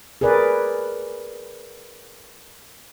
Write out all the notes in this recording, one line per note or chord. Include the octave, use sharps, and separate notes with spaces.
G#4 A#4 B4 D5